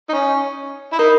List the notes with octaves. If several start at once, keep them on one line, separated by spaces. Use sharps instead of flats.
D#4
C#4
E4
D#4 A#4